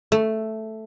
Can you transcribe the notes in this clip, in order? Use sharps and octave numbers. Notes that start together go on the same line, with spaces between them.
A3